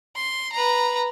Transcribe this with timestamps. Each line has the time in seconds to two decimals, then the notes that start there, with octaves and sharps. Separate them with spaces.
0.16 C6
0.52 B4 A#5